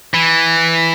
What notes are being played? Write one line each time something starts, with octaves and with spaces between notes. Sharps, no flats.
E3